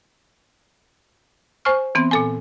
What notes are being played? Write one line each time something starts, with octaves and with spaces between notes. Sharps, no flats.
C5 G#5 C#6 F6
E3 B3 C4
A#2 A4 G#5